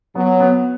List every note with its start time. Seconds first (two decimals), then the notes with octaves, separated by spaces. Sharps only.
0.15 F#3 B3
0.40 B3